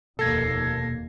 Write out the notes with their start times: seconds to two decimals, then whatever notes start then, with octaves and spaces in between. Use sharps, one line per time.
0.19 F1 D#2 B2 A#3 A4 G#6 A#6 C7